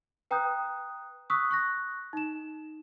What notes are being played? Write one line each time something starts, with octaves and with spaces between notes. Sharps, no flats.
B4 G5 A#5 D#6 F#6 G6
C#6 D#6 E6 F#6 B6
C#6 F#6 A#6
D#4 E7